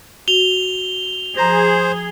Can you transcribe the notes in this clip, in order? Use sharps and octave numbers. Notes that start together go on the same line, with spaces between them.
F#4 F7 G7
F3 G#4 C5 A#5 A#6